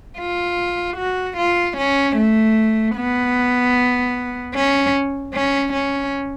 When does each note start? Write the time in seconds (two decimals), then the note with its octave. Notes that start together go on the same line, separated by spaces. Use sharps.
0.19 F4
0.98 F#4
1.38 F4
1.78 C#4
2.17 A3
2.96 B3
4.55 C#4
5.34 C#4
5.74 C#4